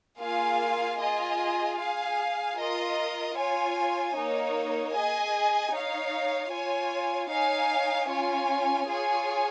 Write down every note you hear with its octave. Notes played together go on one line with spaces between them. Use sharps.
A#3 F4 G#4 F5 G#5
F4 G#4 D#5 G#5
G#4 F5 G#5
F4 A#4 D#5
F4 C#5 G#5
A#3 D#4 C#5
G#4 D#5 G#5
D#4 C#5 F5
F4 C#5 G#5
D#4 C#5 F5 G#5
C#4 F4 C#5 G#5
F4 G#4 C#5 G#5